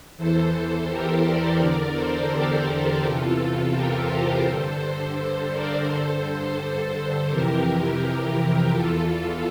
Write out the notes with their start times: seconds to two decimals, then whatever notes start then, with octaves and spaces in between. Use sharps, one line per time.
0.17 E2 E3 A4 C5
0.89 G4 A#4
1.24 A#4 D5
1.59 E2 D3
1.95 A4 C5
2.31 G4 A#4
3.02 E2 C3 E3 F4 A4
3.73 G4 A#4
4.09 A4 C5
4.44 G2 D3 A4 C5
4.80 A4 C5
5.51 A#4 D5
5.87 G2 D3 A4 C5
6.58 A4 C5
7.29 F2 C3 E3 G4 A#4
8.01 G4 A#4
8.72 E2 E3 F4 A4